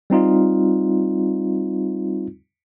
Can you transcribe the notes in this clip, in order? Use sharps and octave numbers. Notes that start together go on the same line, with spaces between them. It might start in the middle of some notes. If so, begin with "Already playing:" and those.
G3 C4 D#4 F4